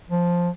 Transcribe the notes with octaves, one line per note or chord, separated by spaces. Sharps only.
F3